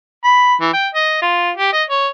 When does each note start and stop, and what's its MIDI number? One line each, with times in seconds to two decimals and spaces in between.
0.25 0.54 83
0.61 0.71 52
0.73 0.88 79
0.95 1.17 75
1.22 1.51 65
1.57 1.72 67
1.73 1.83 75
1.90 2.08 73